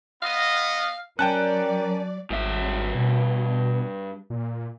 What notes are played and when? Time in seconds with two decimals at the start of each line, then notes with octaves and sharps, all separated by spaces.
0.22 B3 D#5 F5
1.19 F#3 C#4 A#4 D5 G5 A5 F#6
2.30 G#1 G2 E5
2.95 B2
4.30 A#2